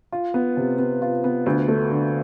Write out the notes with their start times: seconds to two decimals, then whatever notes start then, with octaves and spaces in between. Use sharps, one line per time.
0.12 F4
0.34 B3
0.57 C3
0.78 B3
1.02 F4
1.24 B3
1.46 D2
1.68 A3
1.90 D3